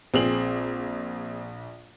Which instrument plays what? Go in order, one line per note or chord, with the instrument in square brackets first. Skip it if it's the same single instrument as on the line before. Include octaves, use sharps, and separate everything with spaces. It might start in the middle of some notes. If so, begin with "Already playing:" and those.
[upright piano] A#1 F#7 [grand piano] C4 G#4